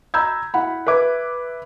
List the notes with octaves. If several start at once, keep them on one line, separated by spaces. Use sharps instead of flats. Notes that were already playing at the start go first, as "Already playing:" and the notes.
A#5 B5 E6 G6 G#6
E4 F#5 B5
B4 E5 D6 G#6